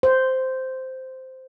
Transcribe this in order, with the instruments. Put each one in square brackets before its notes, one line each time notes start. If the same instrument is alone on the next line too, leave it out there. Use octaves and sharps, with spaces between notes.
[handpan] C5